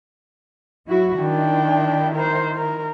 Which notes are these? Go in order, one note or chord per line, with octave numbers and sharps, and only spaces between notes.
F#3 E4 F#4
D#3 D4 E4 G5
A#4 C5
A#4